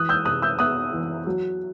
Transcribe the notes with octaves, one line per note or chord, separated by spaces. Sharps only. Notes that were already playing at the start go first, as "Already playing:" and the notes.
Already playing: E3 D#6 F#6
E6 G6
C3 D#6 F#6
E6 G6
B3 D#6 F#6
E3
F#3